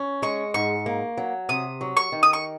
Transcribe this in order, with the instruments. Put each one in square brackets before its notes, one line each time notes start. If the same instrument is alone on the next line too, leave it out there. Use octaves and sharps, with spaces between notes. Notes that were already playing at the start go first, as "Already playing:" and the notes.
Already playing: [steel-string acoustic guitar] C#4
[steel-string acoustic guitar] G#3 [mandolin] C#6
[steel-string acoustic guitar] G#2 [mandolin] C#6
[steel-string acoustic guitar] A#3
F#3
[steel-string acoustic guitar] C3 [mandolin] D#6
[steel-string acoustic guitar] F#3
[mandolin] C#6
[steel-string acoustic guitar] D#3
[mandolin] D#6
C#6